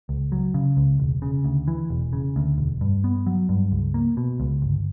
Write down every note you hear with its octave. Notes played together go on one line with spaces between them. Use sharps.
C#2
F#3
C#3
C#2
E1
C#3
D2
E3
E1
C#3
D2
E1
G2
B3
F#3
G2
C#2
A#3
B2
C#2
G1